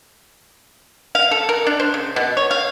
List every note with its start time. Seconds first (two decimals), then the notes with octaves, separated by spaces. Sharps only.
1.15 F5
1.31 A4
1.49 A#4
1.67 D4
1.80 C5
1.94 C#3
2.16 B2
2.37 C#5
2.51 F5